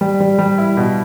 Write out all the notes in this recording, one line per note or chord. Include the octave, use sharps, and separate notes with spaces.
G3
G3
G3
E4
B2